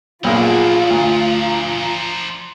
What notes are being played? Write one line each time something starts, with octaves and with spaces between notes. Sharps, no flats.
B1 A#2 F3 D4 F4 G#4 D5 F#5
D2 A#5